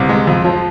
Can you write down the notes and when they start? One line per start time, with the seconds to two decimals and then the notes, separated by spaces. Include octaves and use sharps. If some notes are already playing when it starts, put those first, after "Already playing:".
Already playing: C2 C3 B3
0.09 G#3
0.27 F2
0.44 F3